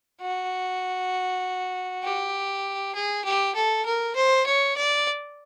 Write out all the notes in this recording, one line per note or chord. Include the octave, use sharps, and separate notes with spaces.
F#4
G4
G#4
G4
A4
A#4
C5
C#5
D5